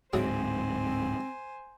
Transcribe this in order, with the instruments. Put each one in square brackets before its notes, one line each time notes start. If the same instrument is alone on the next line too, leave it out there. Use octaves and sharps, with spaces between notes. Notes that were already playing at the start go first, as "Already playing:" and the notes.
[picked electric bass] D1 G#2 [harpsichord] F#3 E4 G#4 [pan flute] C4 [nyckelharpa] C5 G#5